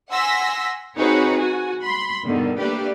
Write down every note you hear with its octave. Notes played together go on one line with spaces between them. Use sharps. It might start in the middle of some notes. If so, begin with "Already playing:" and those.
F#5 G#5 C6 E6 A#6 B6
C4 D#4 F#4 G#4 B4 C#5
F#4 G#5
B5 C6
E2 G2 B2 D3 D#3
A3 A#3 D4 G4 B4 D5